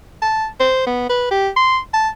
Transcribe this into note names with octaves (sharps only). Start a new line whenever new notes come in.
A5
C5
B3
B4
G4
C6
A5